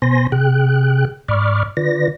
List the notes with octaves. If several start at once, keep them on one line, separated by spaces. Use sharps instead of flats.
B2 B3 C5 G#5 C6 A#6
C3 G#4 G5 F#6
G#2 D5 B5 C#6 D6 F6
D3 F4 B4 D5 A#6